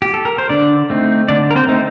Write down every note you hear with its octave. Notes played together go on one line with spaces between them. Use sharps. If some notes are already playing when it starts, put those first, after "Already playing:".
G4
A4
A#4
C5
D3 D4 D5
A3 C4 D#4
D3 D4 D5
A#4
C4 C5
A3 C4 D#4